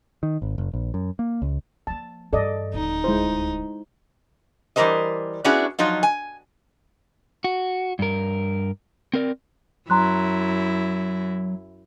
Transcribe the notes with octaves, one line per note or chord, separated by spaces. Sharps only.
D#3
G#1
F#1
A#1
F#2
A#3
C#2
F3 A#3 A5
G2 E3 A4 D5 D#5
D#1 D2 D#4
G#3 E4 C5
E3 G3 B3 A#4 C5 D#5
B3 C#4 D4 E4 F#4 G#4
F3 F#3 D#4 F4
G#5
F#4
G2 A#4
C4 A#4 D5
F#2 F#3 E4 A#5 C6 F#6